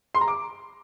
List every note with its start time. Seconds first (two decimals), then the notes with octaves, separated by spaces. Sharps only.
0.15 C6
0.21 A#5
0.28 D6